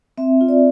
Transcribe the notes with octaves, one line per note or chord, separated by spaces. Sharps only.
C4 E5
F4
D5